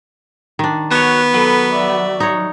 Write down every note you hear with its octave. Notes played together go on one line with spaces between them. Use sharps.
D#3 D4
B3 F#4 C#5
F#3 A4 B5
D5 E5
D#4 C#5